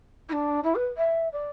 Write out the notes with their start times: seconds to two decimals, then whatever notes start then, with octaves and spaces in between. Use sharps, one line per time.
0.29 E4
0.32 D4
0.64 E4
0.75 B4
0.97 E5
1.32 D5